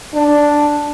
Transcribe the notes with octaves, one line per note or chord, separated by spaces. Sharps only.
D4